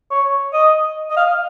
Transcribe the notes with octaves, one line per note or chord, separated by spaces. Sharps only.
C#5
D#5
D#5
F5